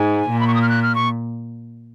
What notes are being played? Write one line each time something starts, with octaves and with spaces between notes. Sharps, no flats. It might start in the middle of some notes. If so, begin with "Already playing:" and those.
Already playing: G#2 G#5
A#2
B5
C#6
D#6
F6
F#6
F6
C#6